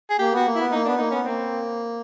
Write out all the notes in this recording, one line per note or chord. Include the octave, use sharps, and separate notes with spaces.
G#4
A#3 G4
B3 F#4
A#3
E4
B3
A#3 D#4
B3 D4
A#3 D#4
B3 C#4
A#3 C4